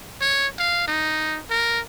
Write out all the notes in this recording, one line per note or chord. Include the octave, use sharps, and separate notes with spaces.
C#5
F5
D#4
A#4